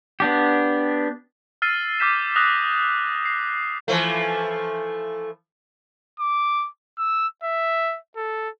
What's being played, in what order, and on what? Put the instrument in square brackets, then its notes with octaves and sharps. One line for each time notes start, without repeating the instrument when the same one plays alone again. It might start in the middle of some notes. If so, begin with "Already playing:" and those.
[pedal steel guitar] B3 D4 G4
[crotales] E6 F6 A6 C7 D#7
D6 F6 G6 B6 E7
D#6 F6 F#6 A#6 F7
C7
[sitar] E3 F3 A3
[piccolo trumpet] D6
E6
E5
A4